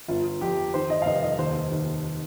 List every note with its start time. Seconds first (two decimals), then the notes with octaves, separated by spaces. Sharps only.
0.08 G1 F4
0.41 F2 G4
0.74 D#3 C5
0.90 D#5
1.02 F5
1.06 F1 D#5
1.22 D#5
1.39 D#2 C5
1.72 D#2